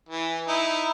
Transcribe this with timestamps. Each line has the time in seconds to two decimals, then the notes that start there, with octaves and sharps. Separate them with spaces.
0.09 E3
0.48 D#4 E4